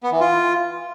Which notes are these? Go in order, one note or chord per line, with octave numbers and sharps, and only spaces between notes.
B3
E3
F4